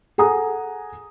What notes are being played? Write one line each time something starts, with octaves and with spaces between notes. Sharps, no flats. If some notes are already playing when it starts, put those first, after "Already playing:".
G#4 A4 F#5 G#5 A#5 D#6